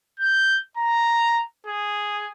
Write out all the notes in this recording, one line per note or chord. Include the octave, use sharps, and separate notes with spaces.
G6
A#5
G#4